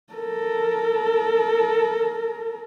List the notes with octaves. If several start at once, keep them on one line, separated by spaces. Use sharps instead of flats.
A4 A#4